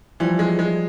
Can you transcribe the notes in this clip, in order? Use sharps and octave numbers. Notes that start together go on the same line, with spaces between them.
E3 F3 G3
G#3
G#3